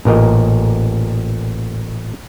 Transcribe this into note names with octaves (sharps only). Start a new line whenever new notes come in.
A1 A#2 A#4 D#5